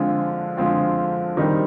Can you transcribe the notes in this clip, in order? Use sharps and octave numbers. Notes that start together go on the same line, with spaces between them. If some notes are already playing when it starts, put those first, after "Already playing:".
Already playing: D3 F3 G#3 C4 F4
D3 F3 G#3 C4 F4
D#3 G3 C4 D#4